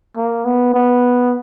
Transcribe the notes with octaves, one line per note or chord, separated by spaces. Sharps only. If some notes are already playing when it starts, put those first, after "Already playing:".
A#3
B3
B3